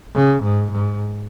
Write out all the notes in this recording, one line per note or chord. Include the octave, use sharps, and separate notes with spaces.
C#3
G#2
G#2